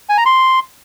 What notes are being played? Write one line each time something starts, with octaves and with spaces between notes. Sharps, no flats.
G#5
A#5
C6